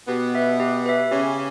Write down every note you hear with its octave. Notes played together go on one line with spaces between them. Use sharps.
B2 B3 G4
B4 E5
G4
B4 E5
C#3 C#4 G4